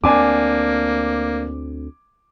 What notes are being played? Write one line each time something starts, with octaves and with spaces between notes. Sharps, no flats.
D2 A#3 C4 D4 G#5 D6